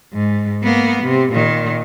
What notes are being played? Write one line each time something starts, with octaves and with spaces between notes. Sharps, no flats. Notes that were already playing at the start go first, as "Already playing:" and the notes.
G#2
A#3 B3
C3
A#2 D#3